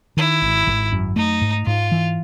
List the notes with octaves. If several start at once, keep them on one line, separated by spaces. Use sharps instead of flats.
D#3 E4
G#1
G#1
F#2
A3 D#4
G#2
G#2 F4
E3